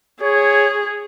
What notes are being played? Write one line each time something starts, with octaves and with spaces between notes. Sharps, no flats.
G#4 C#5